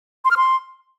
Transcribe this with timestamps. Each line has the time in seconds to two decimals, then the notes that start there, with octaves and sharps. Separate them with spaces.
0.25 C6
0.31 F6
0.37 C6